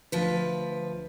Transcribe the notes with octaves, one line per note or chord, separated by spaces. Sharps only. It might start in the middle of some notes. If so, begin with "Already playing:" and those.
D2 F3 B4